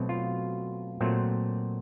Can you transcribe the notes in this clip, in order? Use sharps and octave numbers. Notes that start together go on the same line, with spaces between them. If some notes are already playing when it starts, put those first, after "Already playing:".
Already playing: B2 F#3 A3 C4
F4
A#2 F#3 A3 C4